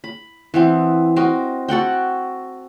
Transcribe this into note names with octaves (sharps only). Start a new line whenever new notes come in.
B5
E3 B3 C4
C4 F#4 A#4 D#5
F#4 A4 F#5 G5